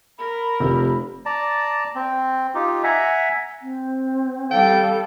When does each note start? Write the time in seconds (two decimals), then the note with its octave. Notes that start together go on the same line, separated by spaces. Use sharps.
0.19 A#4 B5
0.60 F1 C3
1.26 D5 A5 A#5
1.95 C4
2.55 D#4 F4 G4
2.83 E5 F#5 G#5 A#5
3.62 C4
4.51 G3 A4 F5 G5